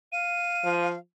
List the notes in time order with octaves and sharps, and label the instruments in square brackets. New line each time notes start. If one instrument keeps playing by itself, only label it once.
[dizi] F5 [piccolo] D#7
[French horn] F3